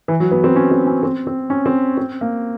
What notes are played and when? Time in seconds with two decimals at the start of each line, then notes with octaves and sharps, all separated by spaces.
0.08 E3
0.20 F#3
0.31 B3
0.44 C4
0.56 C#4
0.71 C4
0.87 C#4
1.03 C4
1.27 C4
1.50 C#4
1.66 C4
1.97 C4
2.21 A#3